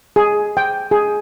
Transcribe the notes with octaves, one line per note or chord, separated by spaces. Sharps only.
G#4
G5
G#4